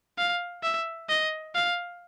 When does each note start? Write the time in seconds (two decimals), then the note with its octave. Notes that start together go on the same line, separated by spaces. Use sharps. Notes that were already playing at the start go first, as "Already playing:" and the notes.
0.18 F5
0.63 E5
1.09 D#5
1.55 F5